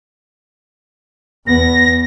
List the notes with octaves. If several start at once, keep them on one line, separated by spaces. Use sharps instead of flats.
E2 B3 A#6